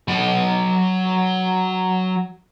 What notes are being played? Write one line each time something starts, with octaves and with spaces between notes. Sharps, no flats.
F#3 B5